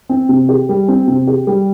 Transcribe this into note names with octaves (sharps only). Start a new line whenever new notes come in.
C4
C3
G4
G3
C4
C3
G4
G3